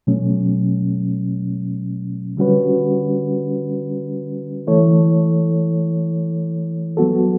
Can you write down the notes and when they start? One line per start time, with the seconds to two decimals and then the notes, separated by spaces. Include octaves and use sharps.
0.07 B2 F#3 A3 C#4
2.37 D3 G3 C#4 F#4 B4
4.67 E3 A3 E4 A4 C#5
6.97 F#3 B3 F#4 A4